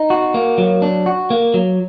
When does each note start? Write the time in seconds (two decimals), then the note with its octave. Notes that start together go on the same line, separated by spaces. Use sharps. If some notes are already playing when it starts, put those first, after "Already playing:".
Already playing: D#4
0.10 F#4
0.34 A#3
0.58 F#3
0.82 D4
1.06 F#4
1.30 A#3
1.54 F#3